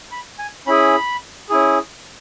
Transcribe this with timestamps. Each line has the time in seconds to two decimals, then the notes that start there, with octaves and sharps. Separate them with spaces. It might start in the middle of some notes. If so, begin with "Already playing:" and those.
0.12 B5
0.39 G#5
0.67 C#4 E4 G#4 B5
1.49 C#4 E4 G#4